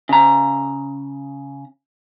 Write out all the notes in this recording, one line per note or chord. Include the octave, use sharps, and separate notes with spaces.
C#3 A#5